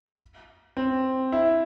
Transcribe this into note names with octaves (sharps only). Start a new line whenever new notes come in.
C4
E4